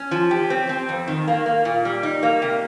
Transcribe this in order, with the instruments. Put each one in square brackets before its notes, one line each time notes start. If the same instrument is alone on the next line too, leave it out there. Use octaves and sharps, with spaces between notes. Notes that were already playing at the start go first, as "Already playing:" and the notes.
Already playing: [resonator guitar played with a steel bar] C#4
F3
G4
C4
C4
F2
D#3
A#3
A#3
A#2
G3
D#4
A#3
C3